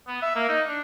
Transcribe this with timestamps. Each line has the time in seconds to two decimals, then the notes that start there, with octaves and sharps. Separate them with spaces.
0.07 B3
0.22 E5
0.36 A#3
0.49 D#4
0.68 D4